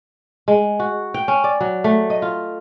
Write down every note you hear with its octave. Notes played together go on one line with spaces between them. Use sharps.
G#3
F#4
G5
C#4
D5
F#3
A3
D#5
F4